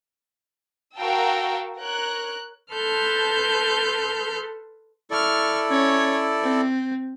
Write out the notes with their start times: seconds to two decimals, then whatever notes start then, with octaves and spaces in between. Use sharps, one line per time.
0.97 F#4 A#4 F5 G5 A5 E6
1.79 A#4 C#5 F#6
2.73 A4 B4 A5 C6 F6 G6
5.11 E4 A4 D5 C#6 F6
5.70 C#4 C#5
6.42 C4